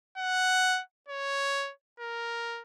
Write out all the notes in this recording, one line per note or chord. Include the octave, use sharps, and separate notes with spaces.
F#5
C#5
A#4